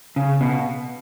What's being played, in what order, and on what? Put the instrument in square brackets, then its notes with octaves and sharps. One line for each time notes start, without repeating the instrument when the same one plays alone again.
[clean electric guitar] C#3
B2